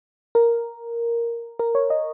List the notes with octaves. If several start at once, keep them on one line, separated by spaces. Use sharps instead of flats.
A#4
A#4
C#5
D#5